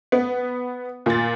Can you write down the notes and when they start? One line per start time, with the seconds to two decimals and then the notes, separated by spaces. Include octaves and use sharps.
0.12 B3
1.06 A#2 A6